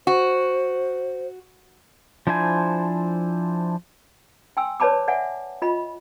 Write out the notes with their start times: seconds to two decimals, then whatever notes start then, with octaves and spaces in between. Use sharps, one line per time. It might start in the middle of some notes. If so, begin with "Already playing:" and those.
0.07 F#4 C5
2.27 F3 D4 E4 C5 G#5
4.57 G5 G#5 C6 E6
4.80 B4 C#5 D5 A5 B5 D6
5.08 D5 E5 F#5 G#5
5.62 F4 D#5 B5